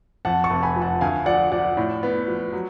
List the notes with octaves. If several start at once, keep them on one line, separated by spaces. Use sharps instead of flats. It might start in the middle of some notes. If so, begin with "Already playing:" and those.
F2 F#5 A5
A5 C#6
F1
G#5 B5
F3
F#5 A5
D2 F5 G#5
F3 D5 F#5
F3 D5 F#5
A2
B3
F3
F#3